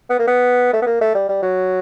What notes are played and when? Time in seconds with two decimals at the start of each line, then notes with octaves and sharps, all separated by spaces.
0.09 B3
0.19 A#3
0.27 B3
0.73 A3
0.82 B3
0.86 A#3
1.01 A3
1.15 G3
1.29 G3
1.43 F#3